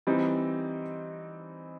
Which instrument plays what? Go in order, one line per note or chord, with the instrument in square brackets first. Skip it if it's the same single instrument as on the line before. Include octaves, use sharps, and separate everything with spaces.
[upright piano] E3 G3 C4 D#4